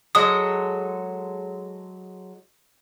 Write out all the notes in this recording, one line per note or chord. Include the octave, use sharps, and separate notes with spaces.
F#3 G#3 A4 D#6